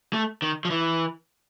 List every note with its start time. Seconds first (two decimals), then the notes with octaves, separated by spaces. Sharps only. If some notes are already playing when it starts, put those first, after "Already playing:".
0.13 A3
0.42 D#3
0.65 F3
0.70 E3